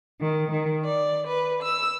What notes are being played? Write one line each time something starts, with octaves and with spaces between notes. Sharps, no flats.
D#3
D#3
D5
B4
E6